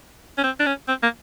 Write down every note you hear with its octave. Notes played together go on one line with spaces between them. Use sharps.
C#4
C4
D4
C#4
C4
A#3